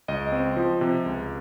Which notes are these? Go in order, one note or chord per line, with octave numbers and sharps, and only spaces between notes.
C#2 D#5
C4
F3
C3
C#2